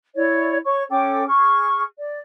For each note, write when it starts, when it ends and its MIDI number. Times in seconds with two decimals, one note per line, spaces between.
0.15 0.57 64
0.15 0.57 73
0.15 0.57 74
0.64 0.83 73
0.64 0.83 85
0.90 1.25 61
0.90 1.25 69
0.90 1.25 79
0.90 1.25 86
1.27 1.83 68
1.27 1.83 85
1.27 1.83 89
1.98 2.19 74